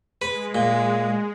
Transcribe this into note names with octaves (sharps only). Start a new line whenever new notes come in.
G#3 B4
A#2